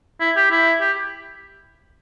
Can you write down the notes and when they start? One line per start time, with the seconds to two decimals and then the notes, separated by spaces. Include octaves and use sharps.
0.20 E4
0.36 G4
0.51 E4
0.81 G4